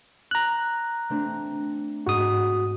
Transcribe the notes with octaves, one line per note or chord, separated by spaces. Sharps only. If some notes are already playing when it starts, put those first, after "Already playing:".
A#5 F#6
A3 C4 D4
G#2 F#4 D#6